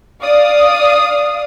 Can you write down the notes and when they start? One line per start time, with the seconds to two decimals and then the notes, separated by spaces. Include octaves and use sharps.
0.22 D5 F5 D#6